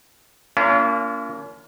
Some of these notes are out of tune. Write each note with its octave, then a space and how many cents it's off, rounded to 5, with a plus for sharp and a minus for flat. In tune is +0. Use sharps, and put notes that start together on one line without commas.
A#3 -10 C#4 +40 F4 -35